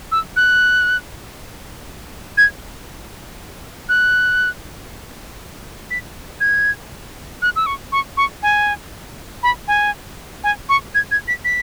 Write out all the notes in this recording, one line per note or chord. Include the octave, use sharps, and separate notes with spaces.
E6
F#6
G#6
F#6
B6
G#6
F#6
E6
C#6
C#6
C#6
G#5
B5
G#5
G#5
C#6
G#6
G#6
B6
B6